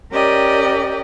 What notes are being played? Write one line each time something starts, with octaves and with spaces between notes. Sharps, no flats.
C#4 G4 A#4 D5 D#5 G5